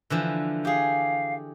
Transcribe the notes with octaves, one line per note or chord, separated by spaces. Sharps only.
D3 E3 F3
G4 G#4 F5